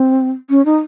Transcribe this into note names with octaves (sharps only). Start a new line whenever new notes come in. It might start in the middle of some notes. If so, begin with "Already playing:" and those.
Already playing: C4
C#4
D#4